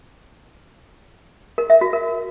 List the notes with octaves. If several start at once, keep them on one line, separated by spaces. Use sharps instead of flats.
A#4
E5
F#4
A#4